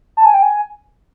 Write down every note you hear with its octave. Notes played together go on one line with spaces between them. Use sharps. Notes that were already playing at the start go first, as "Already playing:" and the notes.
A5
G#5
G5
G#5